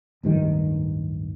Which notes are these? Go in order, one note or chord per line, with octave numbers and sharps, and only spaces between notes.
D1 G2 D#3